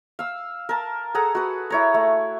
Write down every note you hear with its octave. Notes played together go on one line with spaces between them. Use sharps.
F5 E6
A#4 A5
G#4 A4 F#5 A#5
F#4 B4
E4 C#5 A#5
A3